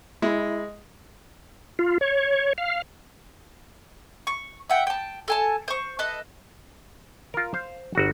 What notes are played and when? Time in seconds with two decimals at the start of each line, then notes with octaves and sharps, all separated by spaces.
0.22 G#3 E4
1.79 F4
2.01 C#5
2.58 F5
4.27 C#6
4.69 E5 F#5 G5
4.87 G5 A5
5.28 A4 G#5 A5
5.68 C5 C#6
5.99 A4 B4 D#5
7.34 F4 A#4
7.54 C5 F5
7.95 G1 F#4